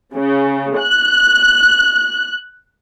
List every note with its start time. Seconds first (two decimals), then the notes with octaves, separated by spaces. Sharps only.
0.14 C#3
0.78 F#6